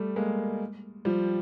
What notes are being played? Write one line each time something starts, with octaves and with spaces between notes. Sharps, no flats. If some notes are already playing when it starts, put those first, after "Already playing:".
Already playing: G3 A3
G#3 A#3
F3 G3